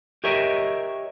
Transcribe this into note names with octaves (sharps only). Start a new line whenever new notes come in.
G4 A#4 C#5 D#5 E5